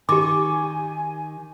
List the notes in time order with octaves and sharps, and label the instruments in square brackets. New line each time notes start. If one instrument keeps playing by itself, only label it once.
[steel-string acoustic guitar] D#3 [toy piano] G4 D6 [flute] G#5